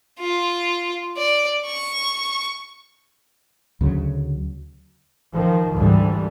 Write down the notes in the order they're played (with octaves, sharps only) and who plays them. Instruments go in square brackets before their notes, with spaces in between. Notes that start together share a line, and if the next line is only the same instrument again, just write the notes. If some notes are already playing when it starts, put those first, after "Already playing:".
[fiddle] F4
D5
C#6
[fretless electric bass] D2 C#3 F#3
[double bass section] D#3 F3
G#1 D2 D3 E3 G3